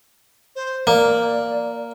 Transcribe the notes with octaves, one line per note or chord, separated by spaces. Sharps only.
C5
A#3 D5